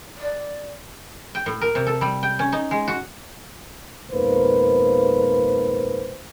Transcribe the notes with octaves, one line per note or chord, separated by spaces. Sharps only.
D5
G5
A2
A#4
C3
A4
G3
G5
C#4
D#4
G#3
F#4
F2 G#2 B2 A#3 B4 C5